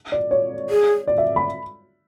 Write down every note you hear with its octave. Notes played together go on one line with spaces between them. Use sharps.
D5
C#5
G#4
D5
E5
B5